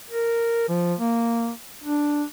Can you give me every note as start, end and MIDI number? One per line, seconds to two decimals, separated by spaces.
0.10 0.67 70
0.69 0.94 53
0.99 1.50 58
1.84 2.24 62